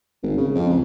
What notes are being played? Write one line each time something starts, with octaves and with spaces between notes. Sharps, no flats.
G#1
C#3
F2
C#2